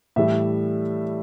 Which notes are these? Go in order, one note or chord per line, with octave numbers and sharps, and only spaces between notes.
A2 E3 G3 E5